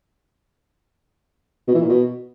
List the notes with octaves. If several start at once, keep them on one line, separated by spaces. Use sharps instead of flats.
B2
E3
A#2
B2